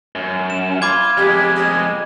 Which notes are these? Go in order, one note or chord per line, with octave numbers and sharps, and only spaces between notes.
F#2
E7
F4 B5 D6 G#6
F2 G#3 G4
D#5